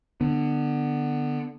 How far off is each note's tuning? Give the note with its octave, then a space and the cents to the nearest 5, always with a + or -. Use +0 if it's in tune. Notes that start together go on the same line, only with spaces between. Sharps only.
D3 +20 B3 +0